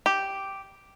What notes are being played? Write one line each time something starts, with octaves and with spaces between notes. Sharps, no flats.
G4